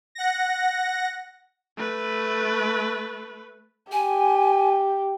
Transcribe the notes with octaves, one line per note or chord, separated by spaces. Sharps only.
F#5 A#6
A3 B4
G4 G#5